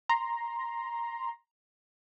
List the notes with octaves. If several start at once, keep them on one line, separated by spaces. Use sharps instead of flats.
A#5 C6